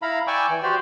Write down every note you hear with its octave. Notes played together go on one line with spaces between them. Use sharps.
E4 F5 A#5 B5
D5 G5 G#5 C#6 D6 E6
E3
F#4 G4 C5 D5 G5